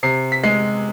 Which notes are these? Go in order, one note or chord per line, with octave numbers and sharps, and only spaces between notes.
C3 C7
B6
G#3 C7